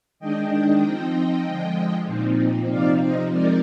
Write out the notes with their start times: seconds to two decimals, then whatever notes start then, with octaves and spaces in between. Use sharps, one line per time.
0.19 D#3 G#3 D4 D#5 G5
0.82 F3 C4 D#4
1.45 D3 F3 G#3
2.06 A#2 F3 C4 D#4
2.69 C3 F3 C4 D#4 D5 F5
3.00 C5 D#5
3.31 F3 G#3 C4 D#4 A#4 D5